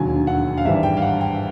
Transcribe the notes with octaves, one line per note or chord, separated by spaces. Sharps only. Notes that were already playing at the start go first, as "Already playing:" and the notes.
Already playing: E1 D#2 D3 F#3 G#5
F#5
F5
G#1 G2 E3 G3 E5
G5
F5
F#5
G5